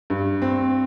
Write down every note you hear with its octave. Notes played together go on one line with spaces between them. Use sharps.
G2
C4